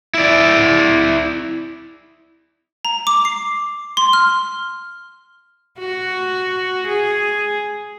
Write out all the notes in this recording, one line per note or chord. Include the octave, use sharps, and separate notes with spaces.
E4 D5
A#5
D6
C7
C6
F6
F#4
G#4